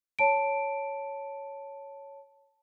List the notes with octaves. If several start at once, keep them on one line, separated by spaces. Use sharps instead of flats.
C#5 A5 D7